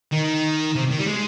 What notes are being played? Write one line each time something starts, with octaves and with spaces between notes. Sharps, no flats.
D#3
C3
D#3
G3
G#3